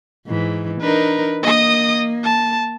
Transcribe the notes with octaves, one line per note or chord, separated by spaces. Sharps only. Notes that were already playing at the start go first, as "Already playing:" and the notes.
G#2 E3
D4 D#4 A#4 B4
A#3 D#5 D#6
A5